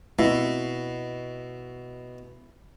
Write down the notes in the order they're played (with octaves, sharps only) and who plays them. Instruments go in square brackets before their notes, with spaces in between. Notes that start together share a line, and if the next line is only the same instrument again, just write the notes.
[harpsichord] B2 [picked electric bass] A3 C4 [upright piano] E4